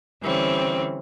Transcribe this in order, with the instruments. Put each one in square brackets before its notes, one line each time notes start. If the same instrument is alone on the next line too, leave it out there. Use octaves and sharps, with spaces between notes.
[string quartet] D3 E3 G3 C4 C#4